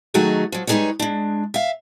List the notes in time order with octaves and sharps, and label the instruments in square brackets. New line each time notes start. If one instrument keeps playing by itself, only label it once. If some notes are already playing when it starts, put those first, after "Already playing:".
[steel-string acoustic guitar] D#3 F#3 A3 D#4 F#4 G#4
F3 F#3
G3 G#3 D#4 G#4 B4 C#5
G#3 D4
E5 F5